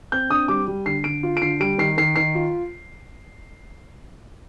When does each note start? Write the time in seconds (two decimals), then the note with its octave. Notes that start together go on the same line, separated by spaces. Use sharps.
0.12 C4 G6
0.30 D4 D#6
0.48 G3 D6
0.67 G3
0.86 D3 C7
1.04 D3 D7
1.23 F4
1.37 D7
1.42 D3 C7
1.60 G3 D7
1.78 D#3 C7
1.98 D#3 C7
2.16 D#3 C7
2.35 F4